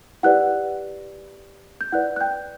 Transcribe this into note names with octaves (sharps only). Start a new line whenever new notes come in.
E4 G4 B4 D5 F#5 F#6
G6
E4 B4 D5 F#5 F#6
F#6
G5 G6